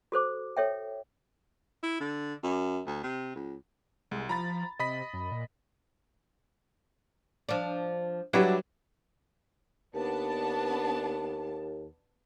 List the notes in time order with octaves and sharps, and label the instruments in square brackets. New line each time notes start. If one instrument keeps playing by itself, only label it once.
[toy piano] F#4 A4 C5 D6
A4 C#5 E5 G5
[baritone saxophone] E4
D3
F#2
D2
C3
C#2
[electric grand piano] C2 [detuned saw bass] G#3
[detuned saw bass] F3 [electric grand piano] A#5 B5 A6
[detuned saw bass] C3 [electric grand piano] D#5 B5 B6
[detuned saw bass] F#2
A#2
[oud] F3 D4
[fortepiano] F#3 G3 B4 [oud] D4 E4 F#4
[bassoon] D#2 [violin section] B3 D4 A5